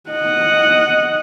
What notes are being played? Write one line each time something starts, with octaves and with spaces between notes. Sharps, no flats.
D#5 F#5